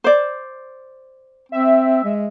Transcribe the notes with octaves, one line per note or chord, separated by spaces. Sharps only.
C5 D5
C4 E5
G#3